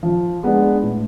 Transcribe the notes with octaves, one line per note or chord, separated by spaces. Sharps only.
F3
G#3 B3 D4
A2